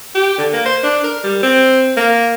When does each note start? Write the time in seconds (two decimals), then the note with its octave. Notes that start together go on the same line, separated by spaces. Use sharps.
0.15 G4
0.38 D3
0.53 A#3
0.65 C5
0.83 D4
1.03 A#4
1.23 G3
1.43 C4
1.97 A#3